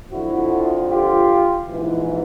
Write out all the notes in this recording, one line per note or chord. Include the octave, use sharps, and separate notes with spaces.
F2 D3 F3 E4 F#4
F4 G4
A#1 G#2 E3